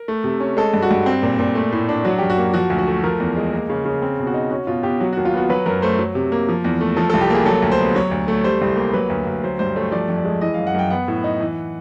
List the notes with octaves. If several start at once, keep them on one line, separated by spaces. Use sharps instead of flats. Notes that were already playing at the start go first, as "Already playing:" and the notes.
Already playing: A#4
A3
C3
C#4
G#3 A4
G2
F#4
G2
C4
A#2
A#2
A3
A2
D4
F#3 F#4
F#2 G4
F#4
A#3
F3 F#4
D2
F#4
A3
F3 A#4
E2
G#3
A#3
C#3
C#3
C4
B2
F#4
D#4
C#4 F#4
B2 F4
B2 G4
F#3 F#4
F#4
D#2
F4
B3 F#4
F#3 B4
F#2 A#4
A3 C5
F#3
C3
A#3
F3
E2
A3
F3 A4
A4
C2
G4
A#3 G#4
F#3 A4
D2
C5
B3
F#3 C#5
D2
A3
G3 C5
C2
A#3
F#3 B4
D2
D2
F#3 C5
G2 C5
A3 C#5
F3 D5
F2
D5
G#3
E3 D#5
F5
F#2
F#5
F#2 G5
B3 F#5
A2
D#4
E3